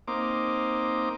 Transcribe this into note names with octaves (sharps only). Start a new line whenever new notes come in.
A#3 C4 D#4 D6